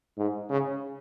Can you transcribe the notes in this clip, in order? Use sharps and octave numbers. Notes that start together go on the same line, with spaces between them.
G#2
C#3